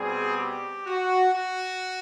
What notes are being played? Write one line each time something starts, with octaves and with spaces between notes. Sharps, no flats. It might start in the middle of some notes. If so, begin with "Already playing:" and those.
Already playing: B2 G3 C4 G#4
G4
F#4
F#4